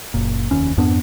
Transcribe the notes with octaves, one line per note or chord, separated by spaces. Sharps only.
F#1 A#2
F1 D#2 C#4
F2 G#2 B3 D4